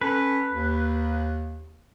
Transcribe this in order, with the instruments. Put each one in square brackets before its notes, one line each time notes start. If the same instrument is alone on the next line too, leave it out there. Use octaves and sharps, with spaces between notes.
[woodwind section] C#4 A4 [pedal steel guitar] B4
[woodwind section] D#2